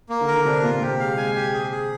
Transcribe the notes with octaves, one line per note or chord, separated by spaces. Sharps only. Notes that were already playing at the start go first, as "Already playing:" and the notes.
A#3
D3
A#4
D3
C3 D4
A#2 F4
C3 G4
G#3 F5
G#3 G#5
G4
G#4
G#4